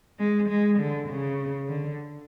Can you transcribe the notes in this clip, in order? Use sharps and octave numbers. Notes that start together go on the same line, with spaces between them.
G#3
G#3
D3
C#3
D3